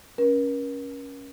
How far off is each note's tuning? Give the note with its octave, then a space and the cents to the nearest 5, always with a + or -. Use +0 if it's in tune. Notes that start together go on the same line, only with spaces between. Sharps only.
C#4 +0 A#4 +40